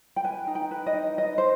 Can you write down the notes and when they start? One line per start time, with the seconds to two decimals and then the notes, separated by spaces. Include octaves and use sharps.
0.16 G5
0.24 B4 G#5
0.47 D#4
0.55 G5
0.71 B4
0.86 D#5
0.94 D#4
1.18 B4 D#5
1.38 C5